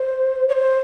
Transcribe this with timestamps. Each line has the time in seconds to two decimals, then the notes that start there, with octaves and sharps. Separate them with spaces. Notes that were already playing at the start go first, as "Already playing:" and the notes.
Already playing: C5
0.49 C#5
0.52 C5